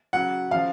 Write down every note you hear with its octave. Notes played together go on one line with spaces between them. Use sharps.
C#3 F#3 F#5
C#3 F3 F5